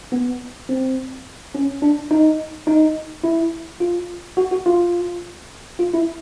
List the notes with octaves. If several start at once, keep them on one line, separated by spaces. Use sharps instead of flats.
B3
C4
C#4
D4
D#4
D#4
E4
F4
F#4
F#4
F4
F4
E4